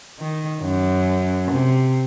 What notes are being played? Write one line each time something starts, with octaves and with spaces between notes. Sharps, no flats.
D#3
F#2
C3